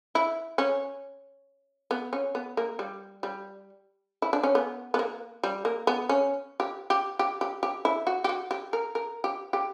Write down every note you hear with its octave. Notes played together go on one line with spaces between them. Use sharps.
E4
C#4
B3
C#4
B3
A#3
G3
G3
E4
D4
C#4
B3
B3
A#3
G3
A#3
B3
C#4
G4
G4
G4
G4
G4
E4
F#4
G4
F#4
G4
A#4
A#4
G4
G4